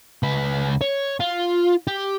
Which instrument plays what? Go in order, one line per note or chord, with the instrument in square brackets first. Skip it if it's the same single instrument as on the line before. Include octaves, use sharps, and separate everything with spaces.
[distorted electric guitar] C#2 B4
C#5
F4
G4